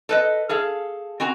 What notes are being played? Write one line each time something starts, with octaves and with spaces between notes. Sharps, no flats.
A4 B4 D#5
G#4 A4 F5
C4 F#4 G#5 A#5